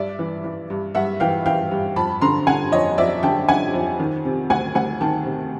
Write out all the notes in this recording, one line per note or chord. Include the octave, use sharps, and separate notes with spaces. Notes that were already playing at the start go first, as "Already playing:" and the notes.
Already playing: G2 D5 E5
E3
E3
G2
G2 E5 F#5
E3 F5 G5
E3 F5 G5
G2
F2 A5 B5
D3 A#5 C6
D3 F#5 G#5
F2 C#5 D#5
F2 D5 E5
D3 G5 A5
D3 F#5 G#5
F2
D#3
C3
D2 F#5 G#5
D2 F#5 G#5
D#3 G5 A5
C3